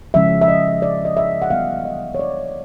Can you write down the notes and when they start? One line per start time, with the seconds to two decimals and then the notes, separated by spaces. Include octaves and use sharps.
0.14 C#3 F3 G#3 C#4 E5
0.42 E5
0.48 D#5
0.82 D5
1.05 D#5
1.17 E5
1.42 F#5
1.50 E3 G3 B3 F5
1.85 D#5
2.15 C#5
2.19 D5